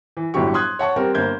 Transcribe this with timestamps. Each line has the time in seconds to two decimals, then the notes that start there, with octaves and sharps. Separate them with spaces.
0.17 E3
0.34 G1 A2 D3 F#3 G4 C#6
0.54 C6 D#6 F#6 G#6
0.79 C#5 F#5 A5 C#6
0.96 G3 C4 A#4
1.15 G1 A#3 C5 G6 G#6